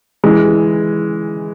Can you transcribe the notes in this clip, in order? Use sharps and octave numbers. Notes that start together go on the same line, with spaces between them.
E3 G#3